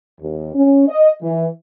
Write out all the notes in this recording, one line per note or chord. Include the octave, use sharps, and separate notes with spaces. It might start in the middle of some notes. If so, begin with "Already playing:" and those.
D#2
C#4
D#5
E3